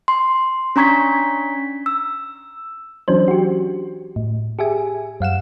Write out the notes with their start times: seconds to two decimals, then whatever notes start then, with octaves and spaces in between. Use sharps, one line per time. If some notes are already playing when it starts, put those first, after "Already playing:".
0.08 C6
0.76 C#4 D4 A#5 C#6 G#6 B6
1.86 E6
3.08 E3 F#3 C#4 D4 C5
3.28 F#4 G4
4.16 A2
4.59 G4 G#4 E5 G#5
5.20 F#2 F5 F#5 E7